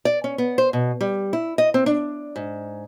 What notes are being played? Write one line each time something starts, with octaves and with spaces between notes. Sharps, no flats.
D5
C#4
B3
C5
B2
G3
E4
D#5
C4
D4
G#2